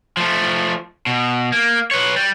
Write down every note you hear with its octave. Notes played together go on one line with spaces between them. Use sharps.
F3 A3
B2
A#3
B4 C#5
G3